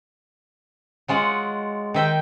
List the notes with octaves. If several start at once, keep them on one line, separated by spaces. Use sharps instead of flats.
F#3 G#3 F4 F#5
D#3 E5 G5